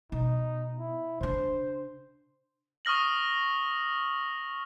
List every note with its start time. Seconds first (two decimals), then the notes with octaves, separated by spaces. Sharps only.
0.12 B2 D#4
0.79 E4
1.21 C#3 D4 C5
2.85 C#6 D#6 F6 A#6 F#7